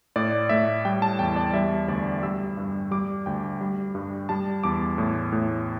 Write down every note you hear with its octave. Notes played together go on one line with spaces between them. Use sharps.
A2 D5
A2 E5
G3 G5
A5
E2 G5
D5
G3 E5
D2 D5
G3 E6
G2
G3 D6
D2 G5
G3
G2
G3 A5
E2 D6
A2
A2